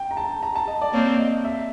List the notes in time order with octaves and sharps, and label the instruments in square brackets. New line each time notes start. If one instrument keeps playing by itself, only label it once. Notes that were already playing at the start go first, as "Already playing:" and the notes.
Already playing: [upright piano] G5
A#5
A5
A#5
A5
D#5
D5
[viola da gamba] A#3 C4 [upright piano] C#5
[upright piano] D#5
E5